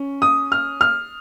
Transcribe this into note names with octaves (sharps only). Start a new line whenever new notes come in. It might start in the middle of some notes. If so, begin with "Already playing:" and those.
Already playing: C#4
D#6
F6
F6